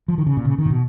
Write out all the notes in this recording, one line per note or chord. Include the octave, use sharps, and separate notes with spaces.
F3
D#3
C#3
A#2
C#3
D#3
A#2
B2